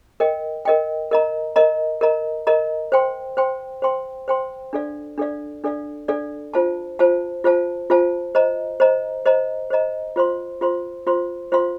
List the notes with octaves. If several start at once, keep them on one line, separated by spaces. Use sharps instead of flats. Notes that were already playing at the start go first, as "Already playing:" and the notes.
A#4 D#5 G5
A#4 D#5 G5
A#4 D#5 A#5
A#4 D#5 A#5
A#4 D#5 A#5
A#4 D#5 A#5
C5 G5 C6
C5 G5 C6
C5 G5 C6
C5 G5 C6
D4 A4 D5 F5
D4 A4 D5 F5
D4 A4 D5 F5
D4 A4 D5 F5
F4 C5 F5 A5
F4 C5 F5 A5
F4 C5 F5 A5
F4 C5 F5 A5
C5 D#5 A#5
C5 D#5 A#5
C5 D#5 A#5
C5 D#5 A#5
F4 C5 F5 C6
F4 C5 F5 C6
F4 C5 F5 C6
F4 C5 F5 C6